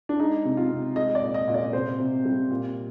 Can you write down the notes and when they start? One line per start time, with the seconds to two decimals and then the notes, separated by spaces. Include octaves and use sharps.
0.09 D4
0.19 G#3 D#4
0.45 C3
0.57 F4
0.70 C3
0.96 G#3 D#5
1.15 D5
1.22 A#2
1.34 D#5
1.48 A#2
1.54 D5
1.73 C3 C5
2.00 C3
2.25 G3
2.51 A#2